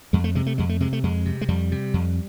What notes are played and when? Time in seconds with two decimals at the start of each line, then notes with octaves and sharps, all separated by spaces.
0.13 F2 G#3
0.24 A3
0.35 C3 G#3
0.46 A3
0.58 F2 G#3
0.69 A3
0.80 C3 G#3
0.93 A3
1.03 F2 G#3
1.26 C3
1.41 G#3
1.48 F2 G3
1.72 C3
1.94 F2